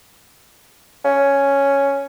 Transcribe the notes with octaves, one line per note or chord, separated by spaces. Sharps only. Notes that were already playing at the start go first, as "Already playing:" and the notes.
C#4